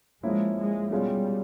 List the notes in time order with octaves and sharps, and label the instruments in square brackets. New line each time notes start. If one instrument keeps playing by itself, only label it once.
[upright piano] F3 A#3 C#4 E4 [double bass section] G#3
[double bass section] G#3
[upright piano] B2 G#3 C#4 F4 [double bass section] G3